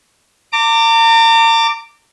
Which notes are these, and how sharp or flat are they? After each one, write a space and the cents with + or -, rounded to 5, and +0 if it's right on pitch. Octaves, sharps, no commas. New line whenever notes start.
A#5 -40 D6 +0